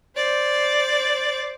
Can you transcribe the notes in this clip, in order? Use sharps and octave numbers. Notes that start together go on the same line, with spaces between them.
C5 D5